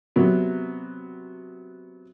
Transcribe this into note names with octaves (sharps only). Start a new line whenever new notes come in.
C3 F#3 B3